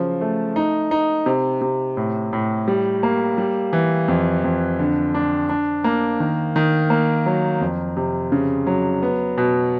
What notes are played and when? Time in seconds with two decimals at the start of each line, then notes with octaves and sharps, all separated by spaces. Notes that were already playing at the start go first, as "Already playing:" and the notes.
Already playing: C#3 F3 F#3
0.21 A3
0.56 D#4
0.91 D#4
1.26 C3
1.61 C3
1.97 A2
2.33 A2
2.68 G3
3.03 A#3
3.38 G3
3.73 E3
4.08 F2
4.44 F2
4.79 D3
5.14 D4
5.49 D4
5.84 A#3
6.20 D#3
6.56 D#3
6.90 A#3
7.26 F#3
7.61 F2
7.97 C3
8.32 C#3
8.67 F#3
9.02 B3
9.38 B2